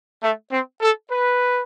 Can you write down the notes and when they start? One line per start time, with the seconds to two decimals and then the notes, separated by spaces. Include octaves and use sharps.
0.22 A3
0.52 C4
0.81 A4
1.11 B4